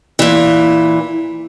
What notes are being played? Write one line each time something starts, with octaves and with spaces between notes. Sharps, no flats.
A#2 E3